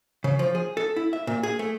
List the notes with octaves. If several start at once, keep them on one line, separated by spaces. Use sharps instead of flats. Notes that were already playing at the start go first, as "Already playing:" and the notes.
C#3
F3
G#4
A4
E4
E5
A#2
G#4
A3